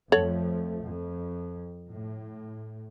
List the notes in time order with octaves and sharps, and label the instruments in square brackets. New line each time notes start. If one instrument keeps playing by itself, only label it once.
[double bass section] F2 F3 A3 [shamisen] A4 C#5 F#5
[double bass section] F2
A2